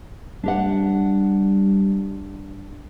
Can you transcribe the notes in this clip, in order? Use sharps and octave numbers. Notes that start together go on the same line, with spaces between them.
G3 D4 G4 F#5